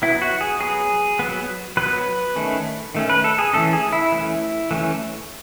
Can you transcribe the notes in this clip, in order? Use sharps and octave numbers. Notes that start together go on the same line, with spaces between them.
F#3 B3 E4
F#4
G#4
F#3 B3 G#4
F#3 B3
F#3 B3 B4
D#3 A3 C#4
D#3 A3 C#4
B4
A4
G#4
E3 A3 C#4 A4
G#4
E4
E3 A3 C#4
E3 A3 C#4